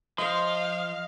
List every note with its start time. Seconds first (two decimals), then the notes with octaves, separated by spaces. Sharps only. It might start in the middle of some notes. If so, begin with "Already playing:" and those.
0.18 F3 D#5 F5 C6